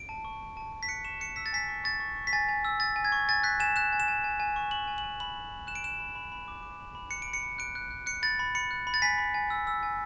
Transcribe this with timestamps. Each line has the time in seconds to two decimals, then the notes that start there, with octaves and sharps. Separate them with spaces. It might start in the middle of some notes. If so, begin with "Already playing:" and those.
Already playing: D7
0.09 A5
0.25 C#6
0.41 A5
0.57 A5
0.73 A5
0.83 B6
0.88 F#6 C#7
1.05 C#6 E7
1.20 F#6 C#7
1.36 E6 B6
1.46 A6
1.53 G#5 B6
1.69 C#6
1.84 C#6 A6
2.00 C#6
2.17 C#6
2.27 B6
2.33 G#5 A6
2.49 G#5
2.65 E6
2.80 G#5 A6
2.96 G#5
3.05 G#6
3.12 C#6
3.29 G#5 A6
3.44 F#6 B6
3.60 G#5 E7
3.76 F#6 E7
3.93 G#5
4.00 E7
4.08 G#5
4.24 G#5
4.40 G#5
4.56 C#6
4.71 C#6 F#7
4.88 G#5
4.98 F#7
5.03 G#5
5.20 B5 F#7
5.36 B5
5.52 B5
5.67 F#6 E7
5.75 D7
5.84 F#6 E7
6.00 B5
6.15 B5
6.32 B5
6.48 D6
6.63 D6
6.80 B5
6.95 B5
7.11 F#6 C#7
7.22 D7
7.28 B5
7.33 C#7
7.43 B5
7.58 F#6 D7
7.75 F#6
7.91 F#6
8.06 F#6 C#7
8.23 B5 A6
8.39 B5
8.55 B5 C#7
8.71 F#6
8.87 B5
8.94 A6
9.02 G#5 B6
9.18 B5
9.34 G#5
9.50 E6
9.67 E6
9.83 G#5